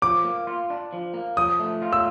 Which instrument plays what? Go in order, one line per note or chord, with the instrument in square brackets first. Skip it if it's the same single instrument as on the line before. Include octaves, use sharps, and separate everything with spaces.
[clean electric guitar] F3 [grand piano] D6
[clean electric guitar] A#3
F4
D4
F3
A#3
[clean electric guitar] F3 [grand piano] D#6
[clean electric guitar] A3
F4
[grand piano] E6